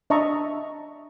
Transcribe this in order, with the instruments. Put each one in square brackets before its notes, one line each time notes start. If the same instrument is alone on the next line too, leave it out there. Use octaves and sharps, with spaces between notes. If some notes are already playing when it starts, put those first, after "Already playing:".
[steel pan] D4 D#5 E5 A5 A#5 C#6